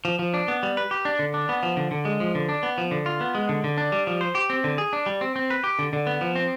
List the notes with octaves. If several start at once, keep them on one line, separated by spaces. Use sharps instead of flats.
F3
F3
D4
B3
G3
B4
G4
D4
D3
D4
B3
F3
D3
D3
G#3
F3
D3
D4
B3
F3
D3
F4
B3
G#3
D3
D3
D4
G3
F3
C5
G4
C4
D3
G#4
D4
G3
C4
C4
B4
G4
D3
D3
B3
F3
C4